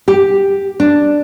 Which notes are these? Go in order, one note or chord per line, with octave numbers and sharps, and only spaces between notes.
G4
D4